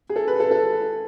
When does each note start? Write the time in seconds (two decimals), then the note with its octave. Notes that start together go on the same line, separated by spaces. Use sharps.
0.09 G#4
0.16 A4
0.28 B4
0.40 A4
0.51 A4